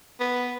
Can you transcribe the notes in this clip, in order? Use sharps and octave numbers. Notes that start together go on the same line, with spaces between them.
B3